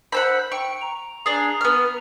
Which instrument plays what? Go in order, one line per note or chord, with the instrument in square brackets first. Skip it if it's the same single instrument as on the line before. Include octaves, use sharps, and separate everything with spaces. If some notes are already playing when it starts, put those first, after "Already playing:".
[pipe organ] C5 E6 [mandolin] F#5 A5 B5
[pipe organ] G5 [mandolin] C#6
[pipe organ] A#5
[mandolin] D4 G#4
B3 F6